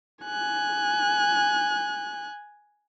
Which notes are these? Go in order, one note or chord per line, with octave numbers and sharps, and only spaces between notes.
G#5 F#6